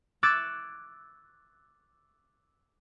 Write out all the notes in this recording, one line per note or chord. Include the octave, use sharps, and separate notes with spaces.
D6 E6 F#6 G#6 A6 C#7